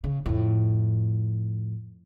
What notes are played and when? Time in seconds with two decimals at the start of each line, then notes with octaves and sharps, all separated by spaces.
0.04 C#3
0.26 F2 A2